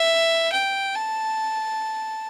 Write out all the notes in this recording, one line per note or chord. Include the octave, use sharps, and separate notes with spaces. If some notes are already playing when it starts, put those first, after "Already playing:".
Already playing: E5
G5
A5